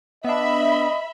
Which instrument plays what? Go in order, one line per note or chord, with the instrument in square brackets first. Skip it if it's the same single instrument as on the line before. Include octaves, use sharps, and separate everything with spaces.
[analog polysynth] B3 D4 [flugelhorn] D#5 [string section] E5 B5